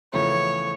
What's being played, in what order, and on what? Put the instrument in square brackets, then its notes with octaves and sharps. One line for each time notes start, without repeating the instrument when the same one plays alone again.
[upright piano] E2 C#3 F3 A3 [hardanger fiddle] C#5